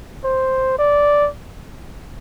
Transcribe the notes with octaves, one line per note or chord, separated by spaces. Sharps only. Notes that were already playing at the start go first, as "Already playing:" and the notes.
C5
D5